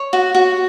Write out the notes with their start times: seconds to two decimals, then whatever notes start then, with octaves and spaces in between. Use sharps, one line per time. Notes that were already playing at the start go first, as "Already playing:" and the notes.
Already playing: C#5
0.13 F#4
0.35 F#4